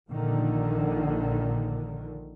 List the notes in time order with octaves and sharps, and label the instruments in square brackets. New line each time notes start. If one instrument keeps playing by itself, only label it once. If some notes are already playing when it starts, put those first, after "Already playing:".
[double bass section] A#1 A#2 D3 D#3